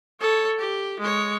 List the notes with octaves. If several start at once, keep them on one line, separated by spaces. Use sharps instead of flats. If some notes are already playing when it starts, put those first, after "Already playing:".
A4 C#5
G4
G#3 C#5